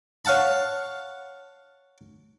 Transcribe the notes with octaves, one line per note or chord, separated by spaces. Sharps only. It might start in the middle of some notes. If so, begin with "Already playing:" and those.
C#5 F5 F#5 A5 B5